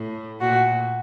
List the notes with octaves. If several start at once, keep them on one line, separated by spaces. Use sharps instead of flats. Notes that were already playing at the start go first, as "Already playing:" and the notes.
Already playing: A2
A#2 F#4